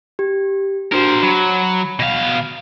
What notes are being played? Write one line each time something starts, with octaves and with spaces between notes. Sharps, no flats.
G4
D4 F#4 A#4 C5
F#3 B5
B2 F5